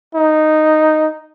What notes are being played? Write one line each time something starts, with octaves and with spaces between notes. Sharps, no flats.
D#4